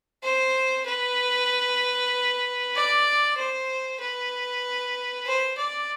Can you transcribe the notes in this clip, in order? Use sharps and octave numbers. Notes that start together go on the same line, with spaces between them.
C5
B4
D5
C5
B4
C5
D5